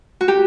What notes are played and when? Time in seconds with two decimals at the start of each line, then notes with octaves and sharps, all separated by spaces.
0.21 F#4
0.28 G4